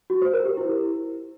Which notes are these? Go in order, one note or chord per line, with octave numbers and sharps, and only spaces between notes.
F#4
C5
A#4
G4
E4